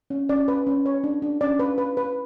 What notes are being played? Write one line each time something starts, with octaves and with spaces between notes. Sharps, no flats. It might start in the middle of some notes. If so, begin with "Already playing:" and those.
C#4
C#4 D5
B4
C#4
C#5
D4
D4
C#4 D5
B4
B4
B4